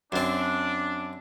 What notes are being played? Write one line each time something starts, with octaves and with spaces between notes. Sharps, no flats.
F#2 C4 D4